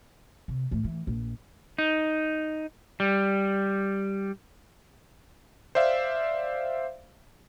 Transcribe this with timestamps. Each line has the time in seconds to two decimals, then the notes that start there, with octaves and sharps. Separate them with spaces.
0.48 C3
0.71 A2 E3
0.84 E3
1.07 A#1
1.78 D#4
3.00 G3
5.75 C5 D5 E5 F5